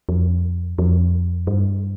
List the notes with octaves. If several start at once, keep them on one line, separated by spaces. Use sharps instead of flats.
F2
F2
G2